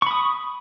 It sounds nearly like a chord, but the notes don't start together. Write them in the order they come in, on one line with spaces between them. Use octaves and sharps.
C#6 B5 D#6